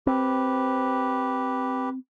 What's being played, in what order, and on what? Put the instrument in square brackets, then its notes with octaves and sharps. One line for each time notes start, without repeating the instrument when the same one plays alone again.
[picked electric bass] C4 [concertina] G4 B4